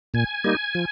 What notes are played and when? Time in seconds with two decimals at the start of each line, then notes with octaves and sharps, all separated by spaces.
0.14 A#2 G#5
0.44 G3 A#3 D#4
0.75 F3